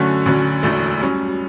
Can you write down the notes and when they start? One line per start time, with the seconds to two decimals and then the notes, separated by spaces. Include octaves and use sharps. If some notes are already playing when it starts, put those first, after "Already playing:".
Already playing: F#2 D3 A3 C#4 F#4
0.26 D2 D3 F#3 C#4
0.63 E1 D2 D3 A3
1.00 G2 F#3 C#4